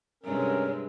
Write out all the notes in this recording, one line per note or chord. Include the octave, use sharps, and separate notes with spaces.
G2 C3 G#3 C#4 A#4